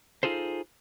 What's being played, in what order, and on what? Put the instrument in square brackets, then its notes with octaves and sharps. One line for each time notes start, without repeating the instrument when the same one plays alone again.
[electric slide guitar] D#4 F4 G#4 A4 C5